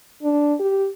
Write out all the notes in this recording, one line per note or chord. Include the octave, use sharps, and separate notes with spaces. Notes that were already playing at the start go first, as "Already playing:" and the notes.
D4
G4